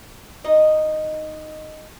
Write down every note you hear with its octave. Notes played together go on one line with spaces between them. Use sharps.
D#4 D#5